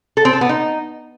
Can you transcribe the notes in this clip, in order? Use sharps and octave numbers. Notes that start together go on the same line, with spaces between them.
A4
C4
A4
B3
D#4